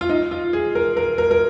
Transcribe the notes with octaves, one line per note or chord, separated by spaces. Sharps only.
F4
D#4
F4
G#4
A#4
A#4
A#4
A#4